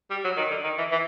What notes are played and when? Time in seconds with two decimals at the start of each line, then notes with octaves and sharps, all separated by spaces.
0.10 G3
0.24 F#3
0.37 D#3
0.50 D3
0.64 D#3
0.78 E3
0.91 E3